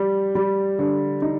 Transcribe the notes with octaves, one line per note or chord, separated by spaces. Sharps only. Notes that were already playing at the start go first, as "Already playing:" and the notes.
Already playing: G3
G3
D3
D#4